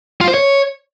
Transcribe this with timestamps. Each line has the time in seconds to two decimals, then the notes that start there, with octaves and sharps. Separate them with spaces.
0.21 F4
0.28 C5
0.34 C#5